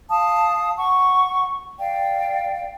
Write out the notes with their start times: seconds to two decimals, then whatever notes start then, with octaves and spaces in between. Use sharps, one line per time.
0.10 F5 A5 D#6
0.77 F#5 C#6
1.79 D5 F5 G5